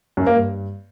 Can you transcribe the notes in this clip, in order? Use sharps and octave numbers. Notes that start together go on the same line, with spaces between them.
F#2
A#3
G2